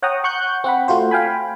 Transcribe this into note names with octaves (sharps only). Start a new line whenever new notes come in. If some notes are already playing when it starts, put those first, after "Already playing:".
C#5 F#5 G5 A#5 D#6
F#5 C#6 F#6 G6
C4 F#5 B5
A3 F4 F#4 C5
F5 G5 G#5 B5